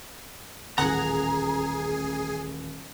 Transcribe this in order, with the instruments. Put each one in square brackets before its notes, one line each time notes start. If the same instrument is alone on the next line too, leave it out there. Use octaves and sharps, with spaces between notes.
[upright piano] D#1 A1 [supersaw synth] G#4 [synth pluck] F#5 [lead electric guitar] A#5